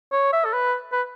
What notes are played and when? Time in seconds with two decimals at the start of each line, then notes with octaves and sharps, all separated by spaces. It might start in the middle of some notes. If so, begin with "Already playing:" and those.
0.12 C#5
0.33 E5
0.45 A4
0.53 B4
0.92 B4